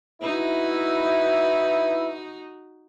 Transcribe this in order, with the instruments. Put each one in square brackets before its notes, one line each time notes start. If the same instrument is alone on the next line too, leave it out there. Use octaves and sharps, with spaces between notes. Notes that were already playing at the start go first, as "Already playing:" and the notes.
[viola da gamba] D#4 F#4 [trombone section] E4 B4